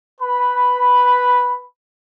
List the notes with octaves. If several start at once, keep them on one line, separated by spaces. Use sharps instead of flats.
B4 B5